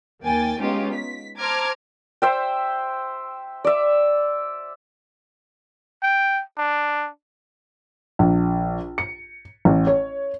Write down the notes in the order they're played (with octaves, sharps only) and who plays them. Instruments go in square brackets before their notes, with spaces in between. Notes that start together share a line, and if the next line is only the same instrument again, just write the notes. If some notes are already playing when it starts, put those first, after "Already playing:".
[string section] D#2 A#3 G5 G#5 A6
G#3 B3 C#4 D#4 F4 G4
B6
C5 A5 A#5 D6 F6 G#6
[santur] C5 E5 G5
D5 E5
[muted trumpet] G5
D4
[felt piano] A#1
C#7
A1
C#5